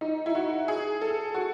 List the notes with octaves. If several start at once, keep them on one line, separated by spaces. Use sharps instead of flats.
D#4
E4
F#4
G#4
A4
F#4